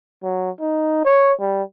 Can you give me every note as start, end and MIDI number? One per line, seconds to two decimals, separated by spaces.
0.23 0.50 54
0.60 1.04 63
1.05 1.33 73
1.40 1.63 55